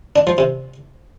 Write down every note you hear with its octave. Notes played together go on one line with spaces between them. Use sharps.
D4
F3
C3